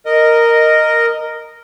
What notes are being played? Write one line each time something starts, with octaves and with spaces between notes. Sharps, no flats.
A#4 D#5